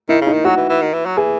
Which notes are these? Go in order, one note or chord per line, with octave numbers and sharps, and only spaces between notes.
D#3 E4
C#3
D#4
D#3
F#3 F#4
E3
E3
D#3
E3
F#3
E3 G#4